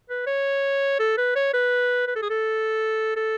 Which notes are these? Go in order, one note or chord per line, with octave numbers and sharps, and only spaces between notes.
B4
C#5
A4
B4
C#5
B4
B4
A4
G#4
A4
A4